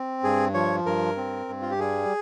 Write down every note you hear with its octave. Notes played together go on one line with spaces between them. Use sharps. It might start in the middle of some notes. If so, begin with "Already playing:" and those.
Already playing: C4
G2 G#4
F3 C#5
G2 A#4
C4
G2
F4
G4
G3 G#4